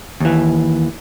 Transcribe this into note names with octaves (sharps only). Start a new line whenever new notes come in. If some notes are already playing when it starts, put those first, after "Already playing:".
D#2 E3